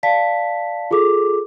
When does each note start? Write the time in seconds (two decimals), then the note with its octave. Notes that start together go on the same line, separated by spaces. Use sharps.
0.03 D5 F5 A5 B6
0.91 F4 G#4 A4 D6